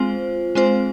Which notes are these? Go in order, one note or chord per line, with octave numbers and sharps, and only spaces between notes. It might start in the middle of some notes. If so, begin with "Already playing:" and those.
Already playing: G#3 C4 F4 C5
G#3 C4 F4 C5